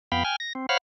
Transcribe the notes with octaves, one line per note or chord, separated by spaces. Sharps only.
F2 B3 F5 G5 B5
G5 G#5 F6
A#6
C4
C5 C#5 F5 F#5 B5 F6